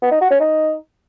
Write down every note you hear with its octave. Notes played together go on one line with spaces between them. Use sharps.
B3
D#4
F#4
C#4
D#4